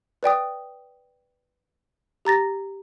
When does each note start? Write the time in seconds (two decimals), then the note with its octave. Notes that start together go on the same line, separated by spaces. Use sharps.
0.23 B4 D5 G5 D#6
2.25 G4 A#5 A6 A#6